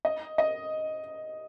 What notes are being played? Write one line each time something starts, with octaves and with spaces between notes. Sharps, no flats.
D#5
D#5